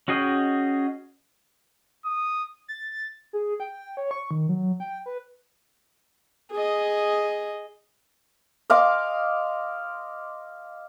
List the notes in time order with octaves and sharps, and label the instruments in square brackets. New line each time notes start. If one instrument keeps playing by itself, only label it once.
[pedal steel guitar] C#4 F#4 G#4 D#5 G5
[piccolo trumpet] D#6
[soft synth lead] A6
G#4
G5
C#5
C#6
D#3
F#3
G5
B4
[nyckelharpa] G#4 D#5
[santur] D#5 F5 C6 D6